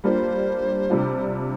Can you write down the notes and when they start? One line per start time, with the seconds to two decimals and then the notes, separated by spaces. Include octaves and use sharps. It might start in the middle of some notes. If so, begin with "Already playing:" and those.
0.04 G3 A#3 D4 F4 C5
0.90 C3 G3 D4 F4